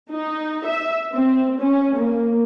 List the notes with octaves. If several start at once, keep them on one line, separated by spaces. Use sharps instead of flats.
D#4
E5
C4
C#4
A#3